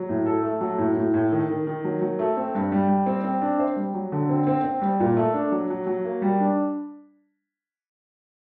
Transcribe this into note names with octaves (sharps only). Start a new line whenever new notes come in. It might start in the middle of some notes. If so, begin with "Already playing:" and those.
Already playing: F#3
A2
A4
A3
F#3
A2
A2
A2
D#3
D#3
D#3
F#3
F#3
A3
C4
G2
G3
G3
C4
C4
D4
C5
G3
F#3
D3
C4
C4
C4
G3
A#2
A3
D4
F#3
F#3
F#3
A#3
G3
D4